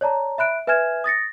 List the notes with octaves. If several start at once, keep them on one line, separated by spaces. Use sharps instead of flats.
C#5 D5 A5 A#5
E5 B5 F#6 D7
B4 E5 G#5 F6 G#6 E7
D#6 A6 A#6 C#7